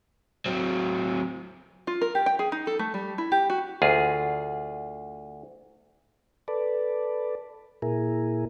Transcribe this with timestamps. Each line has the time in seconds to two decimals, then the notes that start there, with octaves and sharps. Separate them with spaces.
0.46 F#3 C4
1.87 F4
2.02 A#4
2.15 G4
2.26 G5
2.39 G#4
2.52 D#4
2.67 A4
2.79 A3
2.94 G3
3.18 E4
3.32 G4
3.50 F#4
3.82 D2 F4 G#4
6.48 A4 B4 D5
7.82 A#2 E4 G#4 A#4